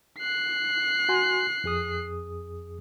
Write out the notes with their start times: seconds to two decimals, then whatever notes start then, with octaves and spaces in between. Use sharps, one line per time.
0.19 F#6 C7
1.09 F#4 G#5 C6
1.64 F2 G#4 D#6